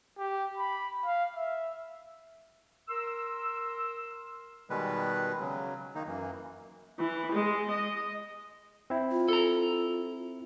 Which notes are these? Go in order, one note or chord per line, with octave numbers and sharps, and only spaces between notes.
G4
B5
F5
E5
A#4 C6 E6
B2 D#3 G3 G#3 B4
C#3 F#3
D#3 A#3 D#4
F#2 E3 A#3
E3
G#3
D#5
C4 E4
F4
A4 A#5